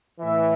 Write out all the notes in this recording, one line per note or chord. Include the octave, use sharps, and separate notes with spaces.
A2 E3 E5